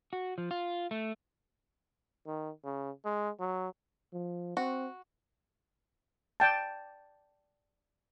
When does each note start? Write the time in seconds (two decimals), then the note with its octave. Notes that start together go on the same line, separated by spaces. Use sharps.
0.13 F#4
0.38 F3
0.51 F4
0.91 A3
2.27 D#3
2.64 C#3
3.05 G#3
3.40 F#3
4.13 F3
4.57 C4 F#4
6.40 D5 G5 A5